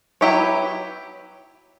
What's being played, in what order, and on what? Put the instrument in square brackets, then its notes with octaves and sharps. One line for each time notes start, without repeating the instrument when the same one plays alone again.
[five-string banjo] F#3 B3 E4 G4 C#5